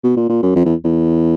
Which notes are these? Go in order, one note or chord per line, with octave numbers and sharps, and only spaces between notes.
B2
A#2
A#2
F#2
F2
E2
E2